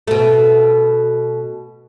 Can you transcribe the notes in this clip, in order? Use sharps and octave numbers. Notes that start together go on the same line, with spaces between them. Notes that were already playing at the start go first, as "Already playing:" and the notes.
B2 A3